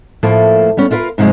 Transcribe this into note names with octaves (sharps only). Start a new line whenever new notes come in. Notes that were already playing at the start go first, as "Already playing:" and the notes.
A2 F3 A3 A#3
G3 B3 C#4
E4 F4 A#4 B4 F5
G#2 C3 F3 F#3 G#3